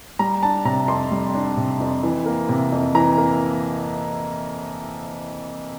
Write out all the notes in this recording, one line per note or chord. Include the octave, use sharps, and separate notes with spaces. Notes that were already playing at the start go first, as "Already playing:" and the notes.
G3 A#5
D4 A5
C3 A#5
F2 C6
G3
D4
C3
F2
E3
A#3
C3
F2
E3 A#5
A#3